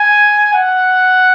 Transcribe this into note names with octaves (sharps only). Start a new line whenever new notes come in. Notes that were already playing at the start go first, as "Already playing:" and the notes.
Already playing: G#5
F#5